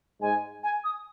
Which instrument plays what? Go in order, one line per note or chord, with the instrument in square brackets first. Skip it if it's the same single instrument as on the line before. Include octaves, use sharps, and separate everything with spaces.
[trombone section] G#2 G#3 [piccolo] G#5
[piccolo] G#5
D#6